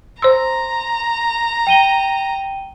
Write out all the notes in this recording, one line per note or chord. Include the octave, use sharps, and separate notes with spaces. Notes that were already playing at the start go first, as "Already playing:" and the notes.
C5 A#5 C6 E6
G5 D#7 G7